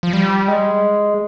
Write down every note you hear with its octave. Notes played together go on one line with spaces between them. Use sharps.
F3
G3
G#3